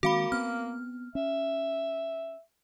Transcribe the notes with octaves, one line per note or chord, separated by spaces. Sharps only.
D#3 G#3 A#3 C4 F#4 F5 B5
B3 C4 F6
C#4 E5